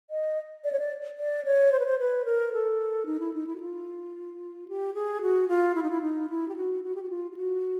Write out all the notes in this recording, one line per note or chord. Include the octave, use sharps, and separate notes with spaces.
D#5
D5
C#5
D5
D5
C#5
C5
B4
C5
B4
A#4
A4
D#4
E4
D#4
E4
F#4
F4
G4
G#4
F#4
F4
E4
D#4
E4
D#4
E4
G4
F#4
F#4
G4
F#4
F4
F4
F#4